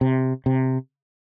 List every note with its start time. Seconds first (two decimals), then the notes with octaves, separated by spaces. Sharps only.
0.01 C3
0.46 C3